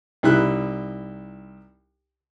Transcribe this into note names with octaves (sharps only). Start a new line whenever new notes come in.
C2 D#4 E4 F#6